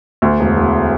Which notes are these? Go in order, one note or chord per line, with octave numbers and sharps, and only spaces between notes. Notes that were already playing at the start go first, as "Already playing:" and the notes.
D2
E1
E1